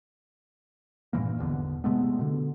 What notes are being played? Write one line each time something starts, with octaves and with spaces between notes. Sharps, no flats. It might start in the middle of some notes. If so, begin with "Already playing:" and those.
G2 A#2 E3 A#3
G#1 E2 B2 D3
C3 G#3 A3 B3
B2 D3